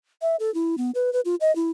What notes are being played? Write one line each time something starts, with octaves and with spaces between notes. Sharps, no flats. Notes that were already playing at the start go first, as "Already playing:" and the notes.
E5
A4
E4
B3
B4
B4
F4
D#5
E4